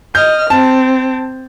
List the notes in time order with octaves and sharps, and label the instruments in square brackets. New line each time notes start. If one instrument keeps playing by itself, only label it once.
[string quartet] D#5 F6 [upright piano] G6
[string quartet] C4 [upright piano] A5